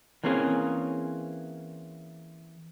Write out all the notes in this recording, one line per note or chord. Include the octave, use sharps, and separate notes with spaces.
E3 A#3 C4 C#4 G#4